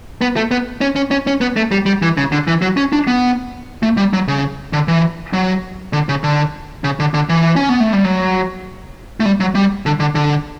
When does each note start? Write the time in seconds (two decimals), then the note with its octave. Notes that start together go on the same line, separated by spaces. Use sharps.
0.21 B3
0.36 A3
0.51 B3
0.81 C#4
0.96 C#4
1.11 C#4
1.27 C#4
1.41 B3
1.56 A3
1.72 G3
1.86 G3
2.02 E3
2.17 C#3
2.32 D3
2.47 E3
2.62 F#3
2.77 C#4
2.93 D4
3.07 B3
3.83 A3
3.97 G3
4.13 F#3
4.28 C#3
4.73 D3
4.88 E3
5.33 F#3
5.93 D3
6.09 C#3
6.24 D3
6.84 C#3
7.00 D3
7.14 D3
7.29 E3
7.56 C#4
7.69 B3
7.80 A3
7.93 G3
8.04 F#3
9.20 A3
9.26 G3
9.40 F#3
9.55 G3
9.86 D3
10.00 D3
10.15 D3